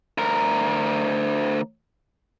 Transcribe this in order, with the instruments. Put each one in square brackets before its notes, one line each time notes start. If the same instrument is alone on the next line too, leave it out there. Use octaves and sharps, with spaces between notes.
[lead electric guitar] D2 A#4